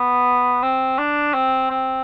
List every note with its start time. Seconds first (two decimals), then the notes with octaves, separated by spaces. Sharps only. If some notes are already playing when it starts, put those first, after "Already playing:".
Already playing: B3
0.63 C4
0.98 D4
1.34 C4
1.70 C4